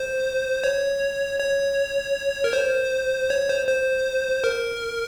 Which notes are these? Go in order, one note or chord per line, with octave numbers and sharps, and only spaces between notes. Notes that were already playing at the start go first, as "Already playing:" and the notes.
Already playing: C5
C#5
C#5
A#4
C5
C#5
C5
C5
A#4